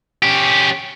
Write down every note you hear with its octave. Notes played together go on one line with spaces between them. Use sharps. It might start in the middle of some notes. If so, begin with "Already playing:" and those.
C#4 G4